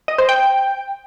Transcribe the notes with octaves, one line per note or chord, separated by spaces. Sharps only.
D#5
C5
G5